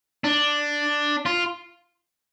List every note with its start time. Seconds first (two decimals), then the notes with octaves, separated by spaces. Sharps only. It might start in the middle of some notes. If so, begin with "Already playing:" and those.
0.24 D4
1.26 F4